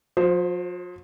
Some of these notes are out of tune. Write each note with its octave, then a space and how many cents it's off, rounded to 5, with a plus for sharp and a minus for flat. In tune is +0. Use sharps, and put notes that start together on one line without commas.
F3 +45 C5 +0